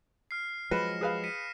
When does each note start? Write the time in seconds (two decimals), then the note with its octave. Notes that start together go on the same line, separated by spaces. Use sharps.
0.31 F6 C7
0.71 F3 F#3 G#3 B4 A#6 C#7 E7
1.01 G#4 B4 F5
1.24 B6 C#7 D#7